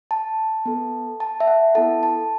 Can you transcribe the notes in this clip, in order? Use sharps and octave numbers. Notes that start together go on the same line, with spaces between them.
A5
B3 A4
A5
E5
F#5
B3 E4 A4 A5
A5